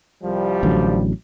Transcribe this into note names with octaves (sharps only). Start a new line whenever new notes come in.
C2 F3 G3
A1 D3 F#3